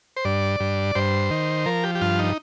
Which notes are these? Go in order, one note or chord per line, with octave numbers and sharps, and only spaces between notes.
C5
G2 D5
G2
G2 C5
D#3
F3 A#4
G4
G4
G2 F4
D#4